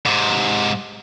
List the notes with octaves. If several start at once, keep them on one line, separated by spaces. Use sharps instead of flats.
G#2 C3